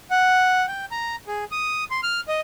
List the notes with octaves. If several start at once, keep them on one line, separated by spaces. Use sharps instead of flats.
F#5
G5
A#5
G#4
D#6
C6
F6
D#5